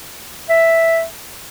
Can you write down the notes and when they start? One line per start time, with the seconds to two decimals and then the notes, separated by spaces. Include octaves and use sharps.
0.49 E5